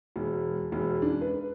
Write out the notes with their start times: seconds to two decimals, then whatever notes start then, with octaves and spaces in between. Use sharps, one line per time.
0.16 E1
0.72 E1
1.02 D4
1.21 B4